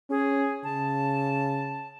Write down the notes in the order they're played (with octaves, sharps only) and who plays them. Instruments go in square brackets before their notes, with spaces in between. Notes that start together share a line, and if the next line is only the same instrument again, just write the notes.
[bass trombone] C#4 [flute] G#4
[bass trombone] C#3 [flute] A5